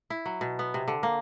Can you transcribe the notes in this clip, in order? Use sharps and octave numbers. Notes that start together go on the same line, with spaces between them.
E4
F#3
B2
B3
C3
D3
A#3